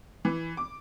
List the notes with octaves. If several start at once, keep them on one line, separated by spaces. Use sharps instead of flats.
E3
D6